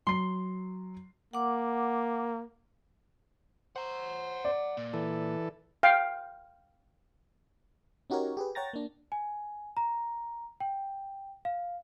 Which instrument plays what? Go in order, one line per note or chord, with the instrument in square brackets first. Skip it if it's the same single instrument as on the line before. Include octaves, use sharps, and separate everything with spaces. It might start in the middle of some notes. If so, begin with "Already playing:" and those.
[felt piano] F#3 C7 [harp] C6
[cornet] A#3 [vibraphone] F#5 D6
[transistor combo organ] C5 [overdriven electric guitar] F#5 A#5
[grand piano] D5
[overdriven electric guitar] A#2
[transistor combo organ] E3 A4
[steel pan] F5 G5
[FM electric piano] C#4 D#4 F#4 G4 A#4 C#5
G4 G#4 B4
C#5 F#5 G5 A#5 A6 A#6
A#3 D4
[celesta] G#5
A#5
G5
F5